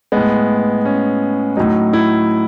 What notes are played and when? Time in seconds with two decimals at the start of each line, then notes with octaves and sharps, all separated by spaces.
0.12 A2 G#3 B3
0.85 C#4
1.57 A2 F#3 D#4
1.93 E4